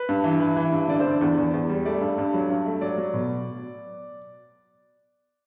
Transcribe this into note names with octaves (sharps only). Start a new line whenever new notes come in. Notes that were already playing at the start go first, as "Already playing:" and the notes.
Already playing: B4
G2
E3
E3
E3
G2
D3 D5
D3 C5
D5
E2
E2
E2
G3
A3 D5
G2
G2
F#3
G2
A3
F#3 D5
F#3
B2